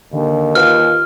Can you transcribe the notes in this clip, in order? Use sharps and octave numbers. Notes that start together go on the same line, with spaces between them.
D#2 D3
F4 B4 F5 F6